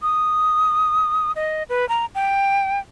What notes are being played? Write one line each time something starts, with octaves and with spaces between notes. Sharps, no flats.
D#6
D#5
B4
A#5
G5